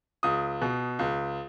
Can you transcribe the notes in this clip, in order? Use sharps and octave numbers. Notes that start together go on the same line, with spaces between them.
C#2 D#6
B2
C#2